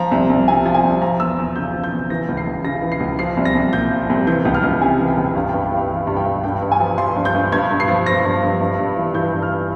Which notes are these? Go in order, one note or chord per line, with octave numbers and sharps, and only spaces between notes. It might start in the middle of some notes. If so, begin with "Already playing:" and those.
Already playing: F3 A#5
C2
C2
C3 G#5
F3
G#5
C2
F3 A#5
E2 E6
E2
C#3 G6
F3
G6
E2
E3 A#6
C#2
C7
C#2
C#3 A#6
E3
C7
C#2
F3 C7
C2
A#6
C2
A#2 G6
F3
C2
E3 G6
C#2
F6
C#2
C3 G#5
E3
G5
C#2
G2 F5
G5
G2
G5
E3 F5
E3
G2
G5
G2
G2 G5
G2
G#5
F3
F3 C6
G2
G6
G2
G2 G#6
G2
C7
F3
F3 A#6
G2
G2
G2
G2
E3
E3 G6
G2
F6